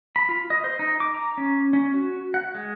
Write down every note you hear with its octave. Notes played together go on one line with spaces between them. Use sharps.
B5
F4
D#5
C5
D#4
D6
A#5
C#4
C#4
F#4
F#5
G#3